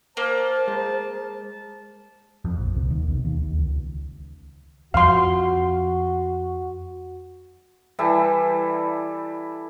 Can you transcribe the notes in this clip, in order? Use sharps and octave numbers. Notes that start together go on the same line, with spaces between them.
A#3 A#4 C5 A5
G#3
F2
A#1
C2
D#2
B1
D#2
D#2
C#2
F2 F3 F#4 F5 C6
E3 G3 E4 A4